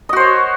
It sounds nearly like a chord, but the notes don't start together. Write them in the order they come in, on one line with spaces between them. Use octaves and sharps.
D#5 F#4 C5 C#5